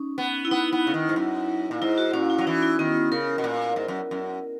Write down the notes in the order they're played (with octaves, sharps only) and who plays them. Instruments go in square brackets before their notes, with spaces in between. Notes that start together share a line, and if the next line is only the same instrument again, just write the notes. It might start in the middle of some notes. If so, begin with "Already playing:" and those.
Already playing: [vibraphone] C#4 D#4
[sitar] B3
[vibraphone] E4
[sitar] B3 [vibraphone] D#4
[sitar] B3
C#3
D#3
G#2
F#2
A#2
[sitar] G#2 [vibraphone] E4
[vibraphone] F#4
[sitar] A#2 [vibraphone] C#4
[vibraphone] E4
[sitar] F#3 [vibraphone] C#4
[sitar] E3 [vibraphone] D#4
[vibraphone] E4
[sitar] D#3 [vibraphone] B3
[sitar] C#3 [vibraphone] A#4
[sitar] B2
A#2
G#2
F#2
F#2